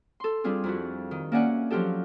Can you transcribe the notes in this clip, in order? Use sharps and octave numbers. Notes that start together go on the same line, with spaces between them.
A4 C6
G3 C4 D4 F4 G#4
F2 E4 F#4
D#3
A#3 C#4 D5 E5 F#5 G#5
F3 F#3 F4 G4 A4